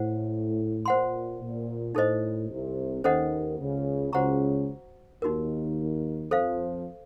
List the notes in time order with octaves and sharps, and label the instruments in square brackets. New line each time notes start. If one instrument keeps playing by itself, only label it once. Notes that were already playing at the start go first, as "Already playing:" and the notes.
Already playing: [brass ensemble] A2 [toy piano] C5 F#5
[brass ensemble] A#2 [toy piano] C5 F#5 C6
[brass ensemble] A#2
[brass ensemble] A2 [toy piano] D#4 A4 C5 D#5
[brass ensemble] C2 C3
[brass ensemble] D#2 D#3 [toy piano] C#4 A4 C5 D#5 F#5
[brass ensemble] C#2 C#3
[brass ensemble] C#2 C#3 [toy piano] F#4 C5 F#5 A#5 C#6
[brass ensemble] D#2 D#3 [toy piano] D#4 F#4 A#4
[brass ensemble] F2 F3 [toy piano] A4 C5 F5